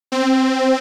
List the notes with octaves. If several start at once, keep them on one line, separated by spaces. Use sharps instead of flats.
C4